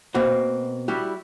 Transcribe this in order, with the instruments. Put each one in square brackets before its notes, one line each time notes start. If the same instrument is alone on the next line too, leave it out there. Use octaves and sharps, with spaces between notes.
[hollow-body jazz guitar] B2 A#3 C4 F#4
G3 E4 F#4 G4